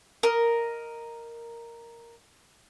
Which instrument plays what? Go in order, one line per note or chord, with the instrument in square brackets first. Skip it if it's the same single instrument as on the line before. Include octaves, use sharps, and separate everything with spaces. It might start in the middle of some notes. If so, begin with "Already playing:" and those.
[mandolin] A#4 D#5